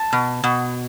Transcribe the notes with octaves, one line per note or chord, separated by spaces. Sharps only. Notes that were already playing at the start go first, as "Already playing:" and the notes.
Already playing: A5
B2
B2